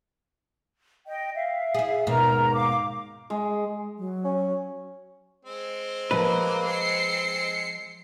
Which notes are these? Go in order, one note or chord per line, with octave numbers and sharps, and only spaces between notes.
D#5 G5
E5 F5
E4 G#4
D#2 G#2 B2 A#4 A#5
F5 D6
G#3
F#3
C#4
G#3 C4
F3 A#3 B4 D#5 G5
C7 C#7